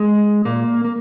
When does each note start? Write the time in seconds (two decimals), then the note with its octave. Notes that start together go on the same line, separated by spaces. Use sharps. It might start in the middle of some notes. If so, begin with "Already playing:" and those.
Already playing: G#3
0.45 A#2 A#3
0.85 A#3